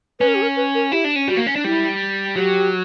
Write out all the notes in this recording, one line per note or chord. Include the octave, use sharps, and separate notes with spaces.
C#4 B4
A#4
G4
A#4
B4
A#4
E4 G4
D4
C#4
G3 F#4
A#3
C#4
D4
G3 E4
F#3 G4